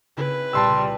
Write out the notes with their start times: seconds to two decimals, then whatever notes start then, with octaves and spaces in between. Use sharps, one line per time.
0.17 C#3 C4 E4 B4
0.53 C2 A#2 G3 A5 C6 E6 A#6